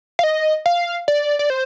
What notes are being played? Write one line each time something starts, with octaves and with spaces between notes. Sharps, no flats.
F5
D#5
F5
D5
D5
C5